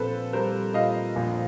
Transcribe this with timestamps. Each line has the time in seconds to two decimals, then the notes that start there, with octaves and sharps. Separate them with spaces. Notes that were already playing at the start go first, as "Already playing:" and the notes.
Already playing: A#1 C4 A4 B4 C5
0.33 G3 A#4 C5
0.74 A#2 D#5 F5
1.16 A#1